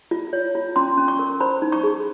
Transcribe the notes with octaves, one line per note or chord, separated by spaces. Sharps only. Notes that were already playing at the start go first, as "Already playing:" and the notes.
F4
C#5
F4
C#4 C6
C#4
C#6
A#4
C5 B5
D#4
C#6
G#4